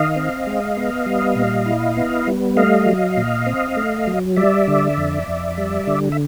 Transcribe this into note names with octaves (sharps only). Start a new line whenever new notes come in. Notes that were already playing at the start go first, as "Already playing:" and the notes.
Already playing: D#3 D#5 F5
C4
G#3
B3
G3
A#2
E4
B3
G3
A3 D#5 F5
F#3
A#2
C4
A3
F#3
G3 D5 E5
D3
F2
F2
G3
D3
E5